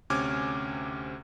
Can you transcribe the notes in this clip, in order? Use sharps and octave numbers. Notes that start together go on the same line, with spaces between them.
D2 C3 C#4 D6 F6 G#6